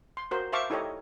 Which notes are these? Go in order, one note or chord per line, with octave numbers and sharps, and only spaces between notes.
C6
F#4 A#4 C5
C5 E5 F5 A5 C#6 D6
D#4 E4 G4 A4 C#5 D#5